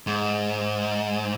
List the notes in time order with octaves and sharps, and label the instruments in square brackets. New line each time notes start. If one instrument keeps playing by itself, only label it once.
[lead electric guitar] G#2